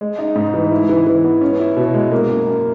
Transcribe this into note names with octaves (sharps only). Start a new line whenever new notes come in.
G#3
D#4
G#2
E3
E4
E3
E3
B3
C#4
E4
B2
G#3
A#3
F#2
F#2